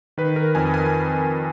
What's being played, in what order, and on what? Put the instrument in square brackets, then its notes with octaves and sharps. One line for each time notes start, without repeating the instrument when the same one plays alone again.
[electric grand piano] D#3 B4
A#4
F2 G#5
G#5